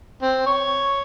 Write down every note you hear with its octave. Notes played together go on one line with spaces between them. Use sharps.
C4
C#5